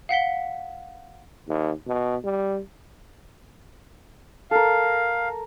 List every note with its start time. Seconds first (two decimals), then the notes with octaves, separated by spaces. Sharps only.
0.09 F5 F#5 B6 G7
1.48 D#2
1.87 B2
2.24 G3
4.51 A4 A#4 F5